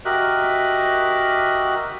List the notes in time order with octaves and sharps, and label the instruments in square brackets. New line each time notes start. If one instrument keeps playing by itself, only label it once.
[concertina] F#4 G4 A#4 D#5 E5 F#6